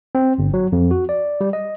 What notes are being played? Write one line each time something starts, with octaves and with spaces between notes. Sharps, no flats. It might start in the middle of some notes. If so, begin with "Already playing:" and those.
C4
G1
F#3
F2
F#4
D5
G3
D#5